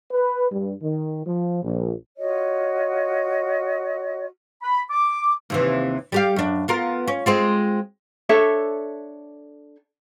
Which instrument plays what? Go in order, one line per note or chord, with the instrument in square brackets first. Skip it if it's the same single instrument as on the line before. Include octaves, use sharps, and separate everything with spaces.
[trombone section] B4
G2
D#3
F3
A#1
[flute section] F4 F#4 C#5 D#5
[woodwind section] B5
D6
[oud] D#2 C3 E3
G3 G4 F5
F#2 D4
B3 F4 A#4
C#4
G#3 C4 F4
[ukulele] D4 A4 C#5 E5